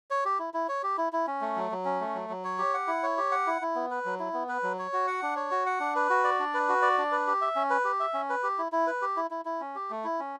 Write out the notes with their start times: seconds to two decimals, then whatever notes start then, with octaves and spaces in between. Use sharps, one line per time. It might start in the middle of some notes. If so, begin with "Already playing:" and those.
0.11 C#5
0.25 G4
0.39 E4
0.54 E4
0.69 C#5
0.83 G4
0.98 E4
1.13 E4
1.27 C#4
1.41 A3
1.56 F#3
1.72 F#3
1.85 C#4
2.00 A3
2.15 F#3
2.29 F#3
2.44 C#5
2.58 G4
2.74 F#5
2.87 E4
3.03 C#5
3.17 G4
3.31 F#5
3.47 E4
3.62 E4
3.75 B3
3.91 B4
4.05 F#3
4.19 E4
4.34 B3
4.49 B4
4.63 F#3
4.78 C#5
4.93 F#4
5.07 F#5
5.22 D4
5.36 C#5
5.51 F#4
5.66 F#5
5.80 D4
5.96 B4
6.10 F#4
6.24 D5
6.39 D4
6.54 B4
6.69 F#4
6.82 D5
6.98 D4
7.12 B4
7.27 G4
7.41 E5
7.56 C#4
7.70 B4
7.84 G4
8.00 E5
8.14 C#4
8.30 B4
8.43 G4
8.58 E4
8.72 E4
8.87 B4
9.02 G4
9.17 E4
9.31 E4
9.45 E4
9.60 C#4
9.75 G4
9.90 A3
10.04 E4
10.20 C#4